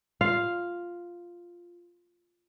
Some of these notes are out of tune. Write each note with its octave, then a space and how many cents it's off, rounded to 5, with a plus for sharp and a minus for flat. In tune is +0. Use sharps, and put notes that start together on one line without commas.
F4 +0 F5 +0